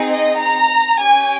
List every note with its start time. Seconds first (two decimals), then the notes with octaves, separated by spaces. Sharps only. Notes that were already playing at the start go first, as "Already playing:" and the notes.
Already playing: C4 D#4 G#4
0.09 D#5
0.38 A#5
0.98 C#4 G4 G#5